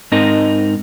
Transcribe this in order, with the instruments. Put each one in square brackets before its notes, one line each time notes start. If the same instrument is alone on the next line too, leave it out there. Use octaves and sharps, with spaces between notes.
[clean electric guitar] G#2 C4 D#4 A#4 D#5